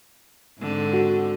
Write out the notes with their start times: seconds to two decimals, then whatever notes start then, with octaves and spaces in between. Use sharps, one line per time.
0.60 G#2 D3 C4
0.93 F#4